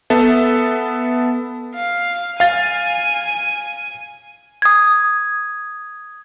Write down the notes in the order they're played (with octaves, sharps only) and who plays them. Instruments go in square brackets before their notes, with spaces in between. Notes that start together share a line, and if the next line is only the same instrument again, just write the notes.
[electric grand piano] B3 A4 E5
[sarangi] F5
[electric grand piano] F5 A6 [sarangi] G#5
[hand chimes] D#6 G#6